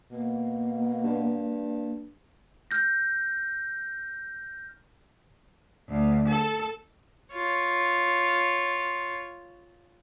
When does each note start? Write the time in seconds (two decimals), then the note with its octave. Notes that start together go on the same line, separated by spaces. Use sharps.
0.12 B2 A#3
1.04 G2
2.71 F6 G6 A#6
5.89 D2
6.28 A4
7.33 F4 C#5